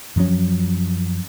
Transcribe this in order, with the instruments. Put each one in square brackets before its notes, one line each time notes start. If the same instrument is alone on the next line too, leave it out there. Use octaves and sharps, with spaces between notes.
[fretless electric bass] F#2 F3 F#3 C#4